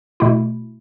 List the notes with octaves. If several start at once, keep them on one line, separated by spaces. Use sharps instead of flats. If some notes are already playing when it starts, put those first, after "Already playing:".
B2 A3 E4